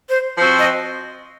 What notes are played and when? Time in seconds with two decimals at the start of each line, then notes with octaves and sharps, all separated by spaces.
0.09 C5
0.37 F3 C4 F#4
0.59 D#5